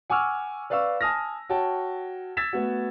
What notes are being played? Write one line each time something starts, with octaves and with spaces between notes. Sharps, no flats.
F#5 G#5 C#6 D6 E6 F6
B4 D5 F5 C#6 E6
G#5 A5 D#6 F6 A#6
F#4 C#5 G5 A5
E6 G#6 A6 B6 E7
A3 B3 F#4